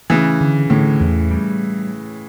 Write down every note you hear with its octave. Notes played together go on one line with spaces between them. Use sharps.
C#3 E3 A3
D3
A2 D3
E2
G3